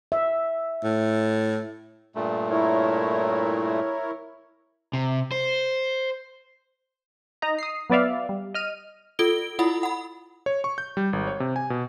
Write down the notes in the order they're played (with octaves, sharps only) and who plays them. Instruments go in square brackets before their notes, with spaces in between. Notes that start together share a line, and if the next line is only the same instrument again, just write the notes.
[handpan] E5
[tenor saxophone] A2
[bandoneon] G2 A#2 A3
[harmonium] E4 A#4 C#5
[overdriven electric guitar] C3
C5
[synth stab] D#4 D#5 A#5
D#6 C7
F#3 B3 B4 D5 E5 F5
G3
D#5 F6 D#7
[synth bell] F4 A4 D7 G7
E4 F4 F#5 B5 D#6
F#5 B5
[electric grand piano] C#5
C#6
G6
G3
G#1
C#5
C3
G#5
B2